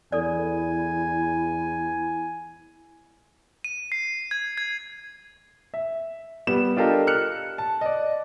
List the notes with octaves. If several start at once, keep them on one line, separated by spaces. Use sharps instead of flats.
E2 E4 A4 D5 G#5
D#7
C7
G#6
G#6
E5
G3 B3 E7
D4 F4 G4 A4 A#4 D#5
F6 F#6 C#7
A5
D5 D#5